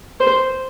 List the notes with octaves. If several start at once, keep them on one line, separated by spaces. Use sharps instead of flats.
C5